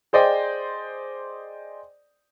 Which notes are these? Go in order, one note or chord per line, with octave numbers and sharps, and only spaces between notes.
G#4 C5 D5 D#5 G5